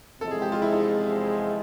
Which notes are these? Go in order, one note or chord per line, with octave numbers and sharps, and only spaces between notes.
E2 C3 F3 G#3 C4 A4
G#4
G4
F4
E4
D#4